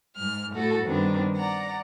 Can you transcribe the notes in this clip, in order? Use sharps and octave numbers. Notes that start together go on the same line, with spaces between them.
G#2 F6
A2 A3 F#4 A4
G2 D#3 B3 C4 D4
D5 F#5 A#5